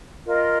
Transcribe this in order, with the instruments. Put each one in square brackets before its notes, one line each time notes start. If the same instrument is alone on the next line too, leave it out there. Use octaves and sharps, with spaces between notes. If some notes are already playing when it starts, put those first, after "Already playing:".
[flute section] F4 A#4 D#5